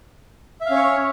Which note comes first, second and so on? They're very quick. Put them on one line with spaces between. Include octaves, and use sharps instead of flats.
E5 F5 C#4 C#5